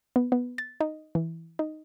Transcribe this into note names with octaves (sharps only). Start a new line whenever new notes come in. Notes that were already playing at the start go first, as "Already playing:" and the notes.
B3
B3
A6
D#4
E3
D#4